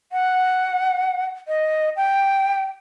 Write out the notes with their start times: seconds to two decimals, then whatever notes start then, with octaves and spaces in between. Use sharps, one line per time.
0.12 F#5
1.48 D#5
1.96 G5